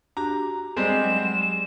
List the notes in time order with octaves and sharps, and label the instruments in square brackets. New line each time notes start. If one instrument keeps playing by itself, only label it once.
[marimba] D4 F#4 G4 [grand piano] A#5
[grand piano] G3 G#3 C4 [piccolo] E7
[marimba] F#3